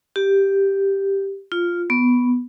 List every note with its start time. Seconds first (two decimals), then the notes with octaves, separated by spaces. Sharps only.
0.16 G4
1.52 F4
1.90 B3